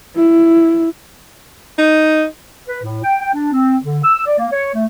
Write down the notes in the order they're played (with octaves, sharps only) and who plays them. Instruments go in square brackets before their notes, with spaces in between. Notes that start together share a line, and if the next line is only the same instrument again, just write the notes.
[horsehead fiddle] E4
[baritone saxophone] D#4
[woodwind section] B4
A2
G5
G5
D4
C4
D3
E6
D5
A#3
C#5
A3